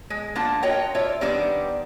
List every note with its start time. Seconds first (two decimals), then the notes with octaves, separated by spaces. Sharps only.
0.10 G#3
0.35 A#3 D4 F4 F#5 A5
0.63 F4 F#4 A#4 C#5 D#5 G5
0.95 F4 C#5 D5 E5
1.21 D#3 G3 B3 C4 D4 D5